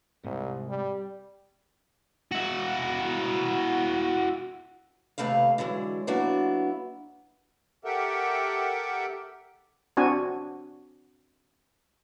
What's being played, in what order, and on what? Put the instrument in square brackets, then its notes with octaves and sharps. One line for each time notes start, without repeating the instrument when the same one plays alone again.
[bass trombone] C2 [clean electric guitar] G#2 C3
[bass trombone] G3
[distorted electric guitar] E4 F#4
[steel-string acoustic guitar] D#2 C3 A3 B4 F5
D3 E3 F#3 G#3
F#3 A#3 B3 D4 E4 F#4
[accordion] G4 A4 A#4 E5 F#5 G5
[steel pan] C4 D4 F#4 G#5